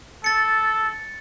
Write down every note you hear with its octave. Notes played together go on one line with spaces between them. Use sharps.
A4 A6 C#7